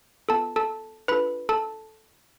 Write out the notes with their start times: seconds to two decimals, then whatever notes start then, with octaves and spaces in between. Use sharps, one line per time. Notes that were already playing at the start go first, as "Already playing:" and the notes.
0.29 B3 F4 A4 A5
0.56 A4 A5
1.08 D4 F4 A4 B4 B5
1.49 A4 A5